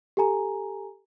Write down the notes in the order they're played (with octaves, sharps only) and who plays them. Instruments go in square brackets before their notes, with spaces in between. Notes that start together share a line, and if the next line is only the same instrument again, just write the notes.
[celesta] G4 A4 G#5 A#5